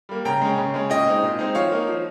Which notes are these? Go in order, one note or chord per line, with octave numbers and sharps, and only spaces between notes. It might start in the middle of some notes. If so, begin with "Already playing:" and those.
G3 A#3
C#3 G5 A#5
G#3 C#4
C#3
G#3 C#4
A#2 D#5 G5
G#3 C4 D#4
A#2
G#3 C4 D#4
F3 C#5 F5
A#3 D#4
F3